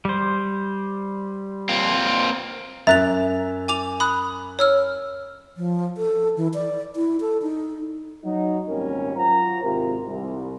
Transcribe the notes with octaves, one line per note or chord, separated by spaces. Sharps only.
G3 C5
A#3 C4 F4
F#2 E5 A#5 F#6 A6 F7
G#5 D6 F7
B5 D#6 F#6
C#5 E6 F6
F3
A4
E3
D5
E4
A4
D#4
F#3 D#4
G#1 D#2 A#2 G3 C#4 A#4
F#2 F#3 F4 C5 A#5
G#1 C3 F4 G4 A#4
C2